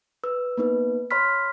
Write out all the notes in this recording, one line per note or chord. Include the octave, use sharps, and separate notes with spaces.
B4 E6
A#3 B3 D#4 B4
C#5 B5 C6 F6 B6